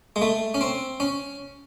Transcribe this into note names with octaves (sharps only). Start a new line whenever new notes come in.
G#3
A3
C#4
C4
C#4